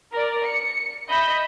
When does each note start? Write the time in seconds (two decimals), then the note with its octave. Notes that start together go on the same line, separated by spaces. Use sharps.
0.13 A#4 D5
0.44 C#7
1.09 D#5 E5 B5 G6